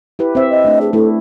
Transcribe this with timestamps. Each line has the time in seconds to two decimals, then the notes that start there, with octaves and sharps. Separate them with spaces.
0.19 E4 G4 B4
0.35 C4 C5 E5
0.50 D#5
0.65 A3 D4
0.81 G#4
0.93 A3 E4 A4